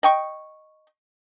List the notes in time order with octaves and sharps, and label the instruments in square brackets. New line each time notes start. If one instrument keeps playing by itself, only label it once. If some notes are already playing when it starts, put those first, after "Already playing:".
[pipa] D#5 G5 C#6